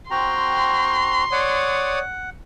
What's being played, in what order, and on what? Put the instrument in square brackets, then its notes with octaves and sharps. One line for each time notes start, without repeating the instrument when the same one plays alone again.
[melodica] C4 F#4 A#5 [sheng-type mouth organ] G5 [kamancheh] C6
[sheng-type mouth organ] C#5 D5 D#6 [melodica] F#5